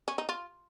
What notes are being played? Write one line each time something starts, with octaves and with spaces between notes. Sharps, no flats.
C#4
D#4
F4